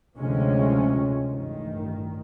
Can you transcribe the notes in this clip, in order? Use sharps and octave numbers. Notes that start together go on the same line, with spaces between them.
D2 C3 F3 G#3 C#4
A1 G2 D#3